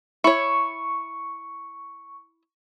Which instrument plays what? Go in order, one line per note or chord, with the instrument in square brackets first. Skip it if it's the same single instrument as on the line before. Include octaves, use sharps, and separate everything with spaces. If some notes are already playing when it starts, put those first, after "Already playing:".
[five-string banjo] E4 C#5 [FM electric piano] C#6